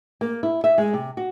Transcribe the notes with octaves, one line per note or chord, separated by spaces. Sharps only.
A#3
E4
E5
G#3
C3
F#4